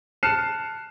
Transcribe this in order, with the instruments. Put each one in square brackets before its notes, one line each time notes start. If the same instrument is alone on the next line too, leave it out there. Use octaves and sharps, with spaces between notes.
[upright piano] A5 F6 F#6 C7 C#7 E7